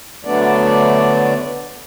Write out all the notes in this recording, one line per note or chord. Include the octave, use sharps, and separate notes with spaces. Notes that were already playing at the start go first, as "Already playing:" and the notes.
D3 F#3 A3 B3 D4 D5